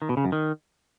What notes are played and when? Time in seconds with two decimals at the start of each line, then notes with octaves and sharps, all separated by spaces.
0.02 D#3
0.09 B2
0.17 C#3
0.25 F#2
0.32 D#3